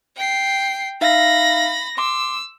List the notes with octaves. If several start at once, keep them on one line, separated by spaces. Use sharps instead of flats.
G5 C7
D#4 E5 F5 B5 A#6
C6 D6 E6